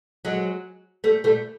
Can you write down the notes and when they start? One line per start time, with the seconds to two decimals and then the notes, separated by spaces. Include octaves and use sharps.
0.25 F#3 G#3
1.04 G3 A3
1.24 G3 A3